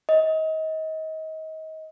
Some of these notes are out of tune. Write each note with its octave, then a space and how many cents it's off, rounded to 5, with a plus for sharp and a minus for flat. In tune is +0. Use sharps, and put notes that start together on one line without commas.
D#5 +30